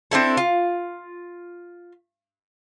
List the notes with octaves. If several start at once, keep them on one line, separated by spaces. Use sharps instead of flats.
C4 D4 E4 A4
F4